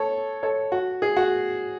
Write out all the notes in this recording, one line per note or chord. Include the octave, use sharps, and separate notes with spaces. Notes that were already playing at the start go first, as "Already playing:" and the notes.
Already playing: A4 C#5
A4 C#5
F#4
G#4
F#4